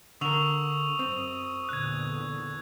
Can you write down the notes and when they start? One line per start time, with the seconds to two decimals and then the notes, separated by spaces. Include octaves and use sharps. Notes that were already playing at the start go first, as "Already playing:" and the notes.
0.21 D3 A#4 C#6 D#6 E6 F7
0.99 F#2 C4
1.69 E2 A#2 D3 F#6 G#6